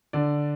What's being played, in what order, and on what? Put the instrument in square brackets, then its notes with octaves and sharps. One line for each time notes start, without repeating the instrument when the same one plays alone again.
[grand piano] D3 D5